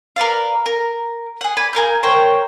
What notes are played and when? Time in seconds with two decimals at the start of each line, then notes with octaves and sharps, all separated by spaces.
0.16 A#4 B4 D5 F5
0.66 A#4
1.41 G#4 F#5
1.57 B4 D5 G#5
1.73 G#4 A#4 F5 G6
2.03 A#4 C5 C#5 G5